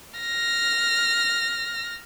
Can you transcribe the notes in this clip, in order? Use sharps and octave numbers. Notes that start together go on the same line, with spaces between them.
F6 A#6